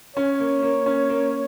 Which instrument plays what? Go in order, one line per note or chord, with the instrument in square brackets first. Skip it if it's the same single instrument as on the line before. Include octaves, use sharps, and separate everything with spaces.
[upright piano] C#4 [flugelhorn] C#5
[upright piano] A#3
A#3
C#4
A#3